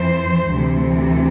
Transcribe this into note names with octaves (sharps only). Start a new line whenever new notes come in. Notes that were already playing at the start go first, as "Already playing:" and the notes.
Already playing: F2 E3 C5
D2 C3 E3